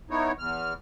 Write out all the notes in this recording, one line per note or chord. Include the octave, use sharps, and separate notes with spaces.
B3 D#4 E4 C#5
E2 F6